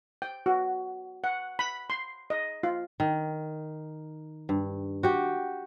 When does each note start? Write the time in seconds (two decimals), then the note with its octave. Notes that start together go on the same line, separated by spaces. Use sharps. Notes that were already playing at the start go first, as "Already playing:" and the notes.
0.22 G5
0.46 F#4
1.24 F#5
1.59 B5
1.90 C6
2.30 D#5
2.63 F4
3.00 D#3
4.49 G2
5.03 F#4 G4